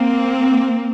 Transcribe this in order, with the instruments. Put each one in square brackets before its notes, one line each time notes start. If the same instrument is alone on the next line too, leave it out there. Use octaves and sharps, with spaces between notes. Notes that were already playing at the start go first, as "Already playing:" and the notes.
Already playing: [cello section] A#3 C4